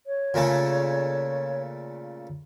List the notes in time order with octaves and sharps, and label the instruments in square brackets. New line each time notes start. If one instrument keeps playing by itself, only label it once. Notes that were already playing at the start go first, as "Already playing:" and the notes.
[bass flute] C#5
[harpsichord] A#2 C#3 A3